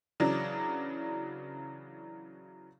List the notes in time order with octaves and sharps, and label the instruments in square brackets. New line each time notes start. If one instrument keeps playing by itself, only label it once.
[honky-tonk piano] C#3 E3 F#3 D4